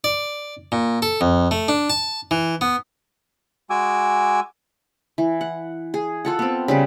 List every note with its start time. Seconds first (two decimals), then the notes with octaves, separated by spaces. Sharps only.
0.04 D5
0.72 A#2
1.02 A4
1.21 F2
1.51 A3
1.68 D4
1.90 A5
2.31 E3
2.61 B3
3.70 G#3 F#4 G#5 D6 E6
5.18 E3
5.41 F#5
5.94 G#4
6.25 F4 A4 F#5
6.39 B3 C4
6.68 C#3 G3 B4